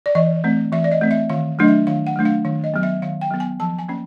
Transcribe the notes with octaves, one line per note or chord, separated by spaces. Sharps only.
D5
E3 D#5
A3 C4
E3 E5
D5
D#5
A3 C4
E5
D#3 F5
F#3 A3 D4 D#5
E5
D#3 F5
F#5
F#3 A3 D4
F5
D#3 F5
D#5
F#3 B3
E5
D#3 F5
G5
F#3 B3
G#5
F3 A5
G#5
A#3 C#4